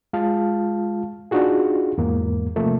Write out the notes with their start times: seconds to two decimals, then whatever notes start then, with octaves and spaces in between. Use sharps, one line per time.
0.13 G#3 F4 F5 A5
1.31 D4 D#4 F4 F#4 G#4
1.98 E2 G#2 A#3
2.56 C3 F3 A3 A#3